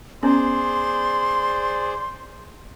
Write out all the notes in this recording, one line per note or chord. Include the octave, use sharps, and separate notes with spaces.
B3 C#4 G#4 C5 D5 C6